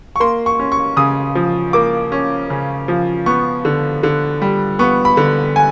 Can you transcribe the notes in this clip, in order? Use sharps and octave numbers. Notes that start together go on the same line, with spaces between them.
C#6
A#3 C6
C#6
C#4
C#6
C#3 D#6
F3
A#3 D6
C#4
C#3
F3
B3 C#6
D3
D3
G3
B3 C#6
B5
D3
G#5